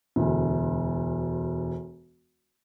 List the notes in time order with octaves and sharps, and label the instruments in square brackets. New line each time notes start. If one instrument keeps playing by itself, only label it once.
[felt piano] E1 D2